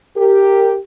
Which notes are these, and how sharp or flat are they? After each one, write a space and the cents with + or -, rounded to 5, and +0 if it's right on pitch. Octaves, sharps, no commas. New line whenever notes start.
G4 +0 A#4 -15